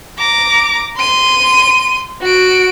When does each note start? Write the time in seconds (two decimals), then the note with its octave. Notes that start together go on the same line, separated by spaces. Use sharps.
0.18 A#5 D6
0.97 C6 D#7
2.22 F#4 D7